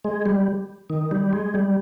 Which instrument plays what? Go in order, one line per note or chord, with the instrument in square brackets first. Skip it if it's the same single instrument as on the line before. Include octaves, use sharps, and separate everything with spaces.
[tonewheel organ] G#3
G3
D#3
G3
G#3
G3